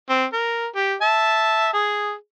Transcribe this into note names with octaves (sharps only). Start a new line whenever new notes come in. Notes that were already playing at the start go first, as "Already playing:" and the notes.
C4
A#4
G4
E5 A5
G#4